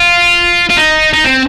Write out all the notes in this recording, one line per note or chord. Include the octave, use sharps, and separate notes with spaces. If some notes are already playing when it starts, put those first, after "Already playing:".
Already playing: F4
F4
D#4
D#4
C4